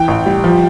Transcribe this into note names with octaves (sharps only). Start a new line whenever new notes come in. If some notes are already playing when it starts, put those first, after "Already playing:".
Already playing: E3 G5
A1
G3
F3